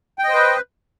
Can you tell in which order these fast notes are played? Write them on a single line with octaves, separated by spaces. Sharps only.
G5 D#5 C5 B4